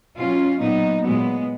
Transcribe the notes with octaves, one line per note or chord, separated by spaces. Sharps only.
B2 F#3 C#4 F4
A#2 F#3 B3 D#4
A#2 F#3 G#3 B3